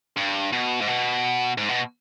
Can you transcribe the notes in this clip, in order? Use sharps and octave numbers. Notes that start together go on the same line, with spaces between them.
G2
B2
G#2
B2
G#2
B2